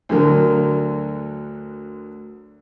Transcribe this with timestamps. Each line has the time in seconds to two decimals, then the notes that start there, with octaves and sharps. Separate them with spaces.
0.09 D2 D3 F#3 A#4